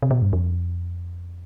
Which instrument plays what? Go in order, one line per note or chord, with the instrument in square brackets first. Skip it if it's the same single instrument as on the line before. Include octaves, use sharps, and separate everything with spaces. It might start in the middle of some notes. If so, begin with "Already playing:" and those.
[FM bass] C3
B2
G2
F2